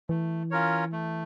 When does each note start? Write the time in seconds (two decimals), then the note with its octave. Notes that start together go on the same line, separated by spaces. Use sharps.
0.09 E3 A3
0.51 C#4 F4 A#4 C#5
0.92 A3